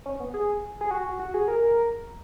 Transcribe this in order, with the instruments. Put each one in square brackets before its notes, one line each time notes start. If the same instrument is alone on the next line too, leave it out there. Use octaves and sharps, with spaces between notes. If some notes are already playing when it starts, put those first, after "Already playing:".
[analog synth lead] C#4
B3
G#4
G#4
F#4
F#4
G#4
A#4